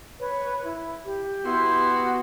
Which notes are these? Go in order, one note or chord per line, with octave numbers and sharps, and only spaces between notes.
B4 C#5
E4
G4
B3 E4 F#4 C6